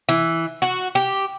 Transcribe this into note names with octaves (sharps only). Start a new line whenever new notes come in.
E3
F#4
G4